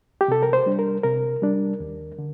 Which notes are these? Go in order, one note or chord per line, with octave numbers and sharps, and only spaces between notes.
G4
C3 A4
A#4
C5
G3 D4
A#4
C3 A#4
G3 D4
D#2
D3